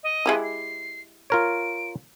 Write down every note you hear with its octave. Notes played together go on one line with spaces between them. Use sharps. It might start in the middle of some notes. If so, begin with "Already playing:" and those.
D#5
G#3 E4 G4
C7
F4 A#4 C#5 D7